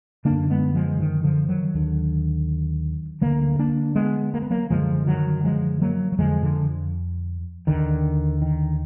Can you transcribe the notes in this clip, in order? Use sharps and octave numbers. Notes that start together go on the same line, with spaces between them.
F#2 D3 A#3 D4
G#3 B3
F3 G#3
D#3
D3 F3
D#3 F#3
D#2 D3
D2 D3 F#3 A#3
A#3 D4
G#3 B3
A#3
B3
F#3 A#3
F#2 D3 F3 G#3
D#3 F#3
F3 G#3
F#3 A#3
F#3
F2 D3 F3 G#3
D3 F3
D#2 D3 D#3
D#3